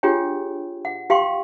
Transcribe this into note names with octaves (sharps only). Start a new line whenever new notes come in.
D4 F4 G4 G#4 C#5 G5
F#5
G4 F5 G5 C6 C#6